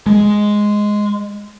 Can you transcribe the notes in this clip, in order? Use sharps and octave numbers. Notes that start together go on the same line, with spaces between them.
G#3